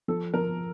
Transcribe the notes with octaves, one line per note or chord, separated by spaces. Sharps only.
F3 A4
F3 A#4